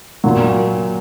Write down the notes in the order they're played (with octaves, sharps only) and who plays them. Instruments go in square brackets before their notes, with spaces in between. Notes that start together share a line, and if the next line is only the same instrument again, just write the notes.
[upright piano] A#2 F#3